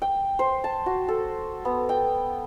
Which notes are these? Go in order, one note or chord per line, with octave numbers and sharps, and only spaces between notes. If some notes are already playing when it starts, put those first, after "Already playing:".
G5
C5
A5
F#4
A4
B3
G5